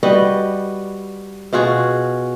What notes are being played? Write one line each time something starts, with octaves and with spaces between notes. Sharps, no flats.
G3 F#4 B4 D#5
B2 F4 F#4 G#4